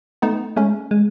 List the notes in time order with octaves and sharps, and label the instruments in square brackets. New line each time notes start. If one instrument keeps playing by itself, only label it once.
[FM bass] A3 [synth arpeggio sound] B3 D#4
[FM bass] G#3 [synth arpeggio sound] A3 C#4
[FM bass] G#3